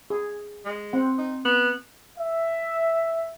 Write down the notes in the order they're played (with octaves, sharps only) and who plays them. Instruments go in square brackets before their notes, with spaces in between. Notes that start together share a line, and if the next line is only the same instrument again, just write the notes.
[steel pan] G#4
[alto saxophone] G#3
[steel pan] C4 F#5
[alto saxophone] D#4
B3
[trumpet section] E5